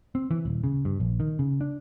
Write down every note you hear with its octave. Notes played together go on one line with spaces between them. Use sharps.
C4
E3
D#1
C#3
G2
A#1
D#3
C#3
D4